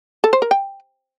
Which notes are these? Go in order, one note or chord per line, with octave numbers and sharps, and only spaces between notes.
A4
C5
A#4
G5